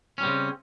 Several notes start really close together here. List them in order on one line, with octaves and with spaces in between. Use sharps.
C#4 G3 C4 C#3